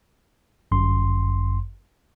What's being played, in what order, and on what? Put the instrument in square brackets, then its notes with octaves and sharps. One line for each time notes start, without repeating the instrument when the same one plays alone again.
[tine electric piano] G1 F#2 C6